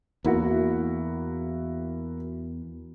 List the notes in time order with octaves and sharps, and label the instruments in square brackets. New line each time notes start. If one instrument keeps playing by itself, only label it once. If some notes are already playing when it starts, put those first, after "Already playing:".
[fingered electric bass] E2 [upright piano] A#3 E4 F#4